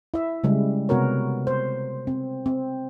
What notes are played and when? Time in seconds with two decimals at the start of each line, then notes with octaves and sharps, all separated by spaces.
0.14 E4 E5
0.44 C#3 G3 G#3
0.89 C3 B3 F#4 A#4 C#5
1.47 C5
2.07 C4
2.46 C4